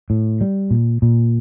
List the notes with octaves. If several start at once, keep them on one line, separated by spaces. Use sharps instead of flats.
A2
G3
A#2
A#2